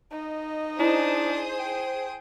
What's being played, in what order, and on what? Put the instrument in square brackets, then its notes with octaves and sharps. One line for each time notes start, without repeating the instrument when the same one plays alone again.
[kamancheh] D#4 D#5
[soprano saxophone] D4 [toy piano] E4 [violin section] G#4 C5 D#6
[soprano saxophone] G5